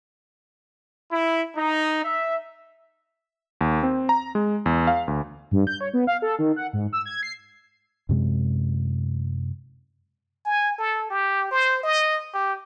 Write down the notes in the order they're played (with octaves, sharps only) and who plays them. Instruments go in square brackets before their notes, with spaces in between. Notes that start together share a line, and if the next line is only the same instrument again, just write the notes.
[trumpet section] E4
D#4
E5
[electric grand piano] D#2
C4
A#5
G#3
E2
F5
D2
[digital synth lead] G2
G6
C#5
B3
F5
A4
D#3
F#5
G#2
E6
G#6
C7
[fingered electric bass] F#2 C3 G#3
[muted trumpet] G#5
A4
G4
C5
D#5
G4